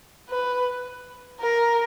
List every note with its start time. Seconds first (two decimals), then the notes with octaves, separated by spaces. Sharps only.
0.29 B4
1.41 A#4